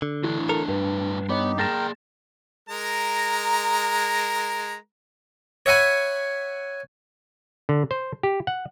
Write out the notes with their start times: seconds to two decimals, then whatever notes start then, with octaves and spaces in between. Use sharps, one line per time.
0.02 D3
0.24 A2 E3 D4
0.49 A4 A#4
0.68 G2 B4
1.29 B3 D#4 G4 C#5
1.58 A#3 G#4 A#4 G5 A6 A#6 E7
2.69 G#3 A#4 A#5
5.66 C#5 E5 F#5 G#5 B5
7.69 D3
7.91 C5
8.23 G4
8.47 F#5